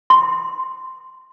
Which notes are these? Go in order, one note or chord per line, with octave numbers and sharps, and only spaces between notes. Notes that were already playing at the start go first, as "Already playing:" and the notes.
C6